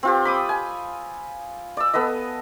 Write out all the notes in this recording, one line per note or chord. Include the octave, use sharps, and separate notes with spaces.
C4 F4 G4
B5 D6 D#6
G#5
D5 E6
B3 A4 B4 D#5